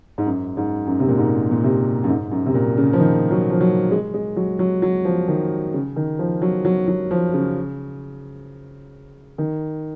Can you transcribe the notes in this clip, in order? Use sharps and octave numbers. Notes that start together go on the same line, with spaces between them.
G#2
F#2
G#2
F#2
C3
A#2
G#2
A#2
C3
F#2
G#2
F#2
C3
A#2
C#3
F3
D#3
F#3
F3
F#3
G#3
G#3
F#3
F#3
F#3
F3
D#3
C#3
D#3
F3
F#3
F#3
F#3
F3
C#3
D#3